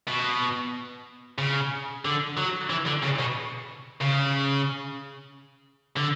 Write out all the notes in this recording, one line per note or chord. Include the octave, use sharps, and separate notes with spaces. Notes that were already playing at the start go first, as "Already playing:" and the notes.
B2
C#3
D3
F#3
E3
D3
C#3
B2
C#3
D3